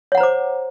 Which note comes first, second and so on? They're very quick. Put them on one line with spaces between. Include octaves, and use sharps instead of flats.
C#5 F#5 A#5 C5 D6